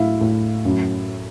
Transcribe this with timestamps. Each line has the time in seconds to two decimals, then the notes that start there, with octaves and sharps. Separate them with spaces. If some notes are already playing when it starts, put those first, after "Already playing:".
Already playing: A2 E4 E5 F5
0.21 A2
0.65 F#2